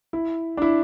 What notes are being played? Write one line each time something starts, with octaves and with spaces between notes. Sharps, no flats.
E4
D4
E4